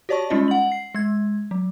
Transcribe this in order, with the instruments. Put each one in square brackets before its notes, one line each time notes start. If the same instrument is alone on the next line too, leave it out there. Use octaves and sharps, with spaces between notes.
[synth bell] F#4 G4 C#5 D5 A5 C#6
G3 G#3 C#4 D#4 F4 D#5
F#5 F#7
C7
G#3 G#6
F#3